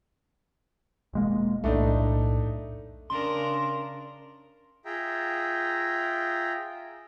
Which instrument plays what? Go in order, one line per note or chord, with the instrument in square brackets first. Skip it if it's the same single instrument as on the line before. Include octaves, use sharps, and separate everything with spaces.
[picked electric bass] E1 G#3 A#3
[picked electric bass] B1 E2 A2 [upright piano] A3 D4 D#4
[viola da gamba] C#3 D4 A#4 [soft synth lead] C6
[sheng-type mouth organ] F4 G#4 E5 G5 A#5